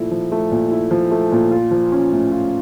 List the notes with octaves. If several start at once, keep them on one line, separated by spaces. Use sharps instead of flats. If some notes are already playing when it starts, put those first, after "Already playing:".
Already playing: A#2 F3 A3 E4
F3
A3
A#2
E4
F3
A3
A#2
F4
F3
C#4
A2
F4